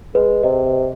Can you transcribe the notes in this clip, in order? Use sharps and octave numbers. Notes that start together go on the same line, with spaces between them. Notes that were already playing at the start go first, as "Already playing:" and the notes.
G#3 B4
C3 D#5